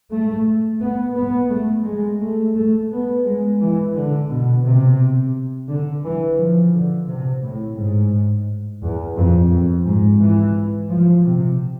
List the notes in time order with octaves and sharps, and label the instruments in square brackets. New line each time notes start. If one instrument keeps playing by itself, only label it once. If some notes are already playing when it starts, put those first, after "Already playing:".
[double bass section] A3
B3
B3
A3
G#3
A3
A3
B3
G#3
E3
D3
B2
C3
D3
E3
F3
D3
C3
A2
G#2
E2
F2
F2
G#2
E3
F3
C3